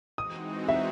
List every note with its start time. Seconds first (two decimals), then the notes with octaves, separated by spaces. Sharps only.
0.18 E3 G#3 C4 D#4 F#4 D#6
0.69 E5